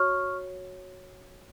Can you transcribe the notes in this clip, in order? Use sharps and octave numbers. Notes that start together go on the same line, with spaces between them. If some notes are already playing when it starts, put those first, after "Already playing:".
Already playing: F#4 C#5 C#6 F6